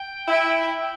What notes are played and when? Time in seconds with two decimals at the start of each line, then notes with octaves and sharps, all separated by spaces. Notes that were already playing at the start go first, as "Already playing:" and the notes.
Already playing: G5
0.28 E4
0.79 G5